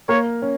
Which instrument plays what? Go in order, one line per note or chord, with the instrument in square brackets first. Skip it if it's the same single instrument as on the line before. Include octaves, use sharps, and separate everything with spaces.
[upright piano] A#3 A#4 [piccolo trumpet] C#5
[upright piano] C#4